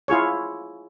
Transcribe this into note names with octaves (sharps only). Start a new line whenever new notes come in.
E4 F4 G#4 C#5